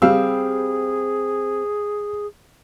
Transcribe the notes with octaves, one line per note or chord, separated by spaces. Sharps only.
G3 C4 G#4 F5 E6